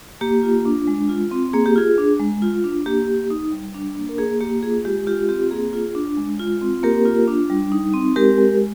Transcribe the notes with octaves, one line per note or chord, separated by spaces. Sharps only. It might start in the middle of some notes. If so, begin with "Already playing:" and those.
A#3 G4
F4
D4
G#3
F4
C4
A#3 G#4
G4
F4 G#4
D4
G#3
F4
D4
A#3 G4
A#3
D#4
G3
D4
A#3
A#4
A#3 G#4
A#3 G4
F4 G#4
G#3 G4
F4 G4
C4 G4
A#3 G#4
F4
D4
G#3
F4
C4
A#3 G4 A#4
F4
D4
G3
D#4
C4
G#3 G4 A#4
G#3